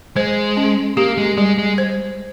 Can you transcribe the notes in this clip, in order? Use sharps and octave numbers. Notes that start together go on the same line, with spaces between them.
G#3 C5
C#4
A#3 G4
G#3
G3 G#3
G#3
C5